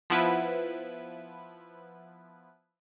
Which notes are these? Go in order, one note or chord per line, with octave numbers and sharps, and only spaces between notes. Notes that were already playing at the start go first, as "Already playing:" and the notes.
F3 B3 E4 B4